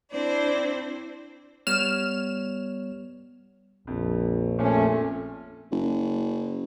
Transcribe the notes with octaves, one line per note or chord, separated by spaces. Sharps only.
C4 D4 E4 C5 D5
G3 B3 C#5 F6 E7
A#1 F2
F2 A#2 A3 C#4
F#1